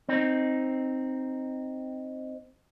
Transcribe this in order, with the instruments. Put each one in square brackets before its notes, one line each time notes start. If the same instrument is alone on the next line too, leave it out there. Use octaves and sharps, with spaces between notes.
[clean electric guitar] C4 D#4